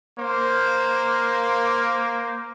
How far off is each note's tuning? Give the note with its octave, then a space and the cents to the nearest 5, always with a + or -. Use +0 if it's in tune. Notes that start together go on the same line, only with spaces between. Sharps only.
A#3 +5 C5 +0